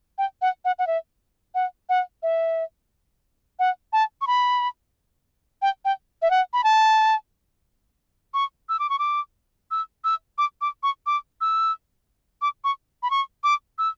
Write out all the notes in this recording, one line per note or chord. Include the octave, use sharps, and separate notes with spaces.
G5
F#5
F#5
F#5
E5
F#5
F#5
E5
F#5
A5
C#6
B5
G5
G5
E5
F#5
B5
A5
C#6
E6
D6
C#6
D6
E6
E6
D6
D6
C#6
D6
E6
D6
C#6
B5
C#6
D6
E6